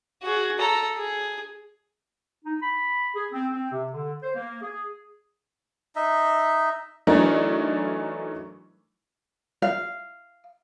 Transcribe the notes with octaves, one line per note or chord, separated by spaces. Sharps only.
F#4 G#4
A4 A#5
G#4
D#4
B5
G#4
C4
C4
C3
D3
C5
A#3
G#4
D#4 D#5 E5
E3 F#3 A3 D4 D#4 A#4
F5